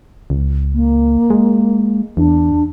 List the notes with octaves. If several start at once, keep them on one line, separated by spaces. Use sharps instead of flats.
C#2
A#3
G#3
E2 D4